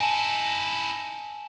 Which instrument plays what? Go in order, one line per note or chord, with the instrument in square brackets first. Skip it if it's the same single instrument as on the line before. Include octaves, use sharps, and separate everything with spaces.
[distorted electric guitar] D#4 E4 [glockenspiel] G#5 A5